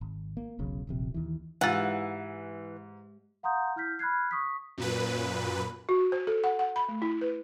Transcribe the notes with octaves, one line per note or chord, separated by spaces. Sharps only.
G#1
A#3
E1 B1 C#3
D#1 A#1 C3
D#2 E3
G#2 E3 G#3 F4 G4 F#5
F5 F#5 A#5 C6 D#6 G6
E4 F6 G6 B6
B5 F6 F#6 G#6 C7
C#6 D#6 B6
F#2 A#2 B4
F#4
C5
A4
F#5
F#5
B5
A3
E4
B4